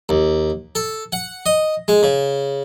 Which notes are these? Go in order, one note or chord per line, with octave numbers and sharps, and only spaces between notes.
D#2
A4
F#5
D#5
G#3
C#3